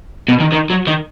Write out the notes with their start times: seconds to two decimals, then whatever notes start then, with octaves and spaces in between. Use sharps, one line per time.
0.28 B2
0.40 D#3
0.52 D#3
0.70 F#3
0.87 D#3